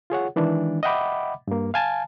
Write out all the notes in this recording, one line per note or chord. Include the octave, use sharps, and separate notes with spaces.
F4 G#4 C#5 F#5
D#3 E3 G#3 D4
D#5 E5 F#5 G5 B5 D6
G2 A#3
F5 G#5 A5